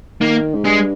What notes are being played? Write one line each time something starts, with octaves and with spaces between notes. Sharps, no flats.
D#3 A#3
G#2
G2 G#3